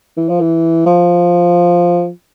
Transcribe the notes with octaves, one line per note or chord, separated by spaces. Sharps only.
E3
F3
E3
F3